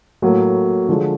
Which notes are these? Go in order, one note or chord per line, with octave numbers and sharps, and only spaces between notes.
A2 F#3 A#3
D3 F3 G#3